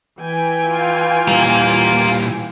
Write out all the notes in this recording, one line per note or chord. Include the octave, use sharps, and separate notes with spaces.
E3 G5 G#5
F4
A#2 G3 F5 A#5